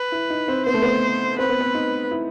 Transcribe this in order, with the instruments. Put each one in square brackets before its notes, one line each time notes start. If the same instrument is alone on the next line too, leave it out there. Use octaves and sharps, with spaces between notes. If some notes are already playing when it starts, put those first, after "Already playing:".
Already playing: [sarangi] B4
[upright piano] E4
D#4
C4
[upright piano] B3 [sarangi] C5
[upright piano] A3
B3
[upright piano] C4 [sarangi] B4
[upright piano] B3
C4
D#4
E4